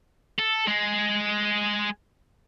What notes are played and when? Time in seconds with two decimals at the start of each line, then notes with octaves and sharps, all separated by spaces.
0.39 A4
0.68 G#3